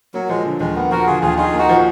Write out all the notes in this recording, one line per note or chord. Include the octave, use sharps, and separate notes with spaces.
F#3 A#3
F3 G#3
D3
D#2 G#3
A#3 B3
F3 F#4 A#4
D3 F4 G#4
D#2 F4 G#4
D#4 F4 G#4
A#3 D#4 F#4
F3